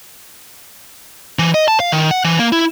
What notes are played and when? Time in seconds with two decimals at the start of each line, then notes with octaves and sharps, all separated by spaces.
1.39 E3
1.54 D#5
1.68 A5
1.80 F5
1.92 D#3
2.11 F#5
2.24 E3
2.39 A#3
2.52 E4